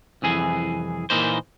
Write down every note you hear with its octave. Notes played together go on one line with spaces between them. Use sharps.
C2 F2 E3 G#4
A#2 E3 A#3 D#4 C5